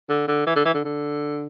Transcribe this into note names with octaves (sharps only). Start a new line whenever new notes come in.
D3
D3
E3
D3
E3
D3
D3